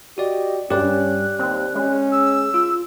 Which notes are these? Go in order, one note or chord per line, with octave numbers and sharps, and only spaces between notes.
F#4 G4 D5 D#5
G2 C#4 G4 D5 F#6
D#2 C4
G#3 C#4
E6
F4